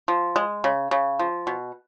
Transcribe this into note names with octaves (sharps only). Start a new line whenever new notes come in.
F3
G#3
C#3
C#3
F3
B2